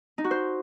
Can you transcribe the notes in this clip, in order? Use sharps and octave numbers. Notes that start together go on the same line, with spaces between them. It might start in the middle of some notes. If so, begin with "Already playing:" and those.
D#4
F#4
C5